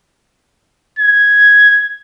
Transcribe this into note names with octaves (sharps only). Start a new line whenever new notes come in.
G#6